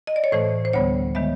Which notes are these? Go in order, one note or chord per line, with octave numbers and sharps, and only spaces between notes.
D#5
D5
C#5
A2 E3 A3 C5
C5
D2 D3 G3 B3 C#5
D#3 G#3 B3 E5